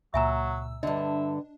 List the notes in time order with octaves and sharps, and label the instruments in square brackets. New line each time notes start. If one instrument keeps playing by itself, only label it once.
[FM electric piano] C#2 A#2 E6 [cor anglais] F#3 [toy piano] E5 G#5 A#5
[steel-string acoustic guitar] G2 D3 [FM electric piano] D4 [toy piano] D#5 [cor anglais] E5